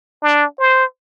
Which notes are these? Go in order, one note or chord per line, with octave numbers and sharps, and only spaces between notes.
D4
C5